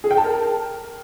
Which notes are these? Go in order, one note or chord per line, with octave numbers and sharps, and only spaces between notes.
G#4
G5
A5
A#4